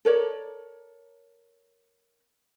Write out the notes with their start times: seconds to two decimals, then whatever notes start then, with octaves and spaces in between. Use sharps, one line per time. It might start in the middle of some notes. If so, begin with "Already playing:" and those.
0.05 A4 A#4 C#5 D5